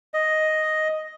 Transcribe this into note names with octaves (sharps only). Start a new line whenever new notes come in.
D#5